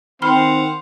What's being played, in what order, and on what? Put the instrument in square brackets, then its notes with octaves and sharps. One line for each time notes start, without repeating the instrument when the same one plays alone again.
[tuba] D#3 [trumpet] C4 [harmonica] C5 F5 F#5 [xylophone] B5 C6 F6